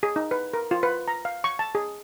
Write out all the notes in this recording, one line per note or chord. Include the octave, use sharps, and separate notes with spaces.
G#4
D#4
B4
A#4
F4
B4
A#5
F5
C#6
A5
G#4